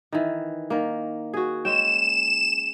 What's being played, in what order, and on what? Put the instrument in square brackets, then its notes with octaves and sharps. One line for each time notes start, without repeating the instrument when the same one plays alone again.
[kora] D#3 E3
D#3 A#3
F#4 G#4
[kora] G#3 C#4 G5 [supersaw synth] E7